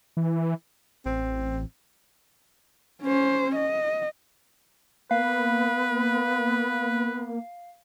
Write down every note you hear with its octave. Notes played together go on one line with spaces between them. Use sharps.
E3
A1 C4
C#4 C5
D#5
A#3 B3 B4 F5